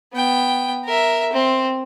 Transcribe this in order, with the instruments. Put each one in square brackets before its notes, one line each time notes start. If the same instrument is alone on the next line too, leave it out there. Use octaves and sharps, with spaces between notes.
[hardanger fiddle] B3 G5
A#4 E5
C4